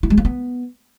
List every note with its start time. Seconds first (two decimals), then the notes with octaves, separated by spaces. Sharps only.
0.03 E4
0.10 G#3
0.18 A#3
0.25 B3